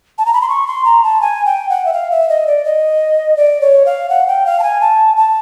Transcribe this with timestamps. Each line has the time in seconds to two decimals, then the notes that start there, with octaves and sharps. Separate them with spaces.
0.18 A5
0.26 A#5
0.33 B5
0.41 C6
0.49 C#6
0.67 C6
0.85 A#5
1.03 A5
1.21 G#5
1.46 G5
1.69 F#5
1.85 E5
1.93 F5
2.11 E5
2.29 D#5
2.47 D5
2.65 D#5
3.37 D5
3.61 C#5
3.86 F5
4.09 F#5
4.28 G5
4.46 F5
4.60 A5
4.63 G#5
4.81 A5
5.17 A5